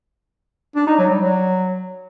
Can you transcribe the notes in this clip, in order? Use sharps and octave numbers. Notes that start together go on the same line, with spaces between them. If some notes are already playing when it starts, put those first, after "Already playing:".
D4
D#4
F#3
G3
F#3